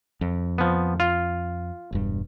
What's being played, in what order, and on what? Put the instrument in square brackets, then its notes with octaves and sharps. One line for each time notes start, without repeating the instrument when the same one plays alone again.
[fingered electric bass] F2
[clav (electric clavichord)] F3 B3
F4
[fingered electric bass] E1 G2